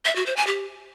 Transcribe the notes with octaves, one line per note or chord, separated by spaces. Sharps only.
E5
F#4
C5
G#5
G4